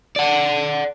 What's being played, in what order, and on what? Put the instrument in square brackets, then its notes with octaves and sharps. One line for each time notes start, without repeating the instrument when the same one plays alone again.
[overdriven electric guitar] D5 F#5